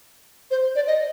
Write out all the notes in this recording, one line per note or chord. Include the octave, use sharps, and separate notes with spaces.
C5
D5
D#5